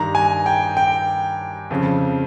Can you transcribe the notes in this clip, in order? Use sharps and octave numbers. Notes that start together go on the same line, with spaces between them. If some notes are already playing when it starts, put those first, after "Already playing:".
Already playing: G2 D#3 A#5
G#5
G5
G5
F2 C#3